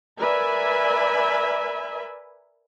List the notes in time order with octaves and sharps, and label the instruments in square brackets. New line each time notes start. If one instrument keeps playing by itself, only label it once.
[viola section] A#4 B4 D5 E5 G#5 B5